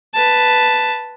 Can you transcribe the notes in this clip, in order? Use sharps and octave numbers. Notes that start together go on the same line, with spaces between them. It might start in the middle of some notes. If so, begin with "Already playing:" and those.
B4 A5